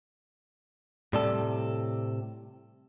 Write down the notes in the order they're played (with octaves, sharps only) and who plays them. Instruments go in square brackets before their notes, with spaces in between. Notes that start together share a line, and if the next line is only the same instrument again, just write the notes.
[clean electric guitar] A2 C3 A4 [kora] G3